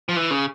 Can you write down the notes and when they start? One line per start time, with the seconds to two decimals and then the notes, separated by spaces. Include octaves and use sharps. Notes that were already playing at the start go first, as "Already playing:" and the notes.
0.09 F3
0.16 E3
0.31 C#3